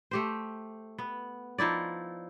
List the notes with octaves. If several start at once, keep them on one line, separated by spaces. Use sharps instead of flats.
A3 G4 C5
B3
F3 D#4 E4 D5